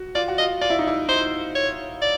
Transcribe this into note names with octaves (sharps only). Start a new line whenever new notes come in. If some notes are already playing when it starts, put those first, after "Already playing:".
Already playing: F#4
F4 D5
F#4
F4 D#5
F4 D5
E4
D#4
E4
D#4 C5
C#5
D5